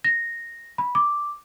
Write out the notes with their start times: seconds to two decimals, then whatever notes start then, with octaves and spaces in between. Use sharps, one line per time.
0.04 A#6
0.78 B5
0.95 D6